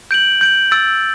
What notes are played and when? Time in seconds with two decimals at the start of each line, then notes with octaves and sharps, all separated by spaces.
0.11 G6 D7 F#7
0.41 G6 D7 F#7
0.71 E6 A6 D7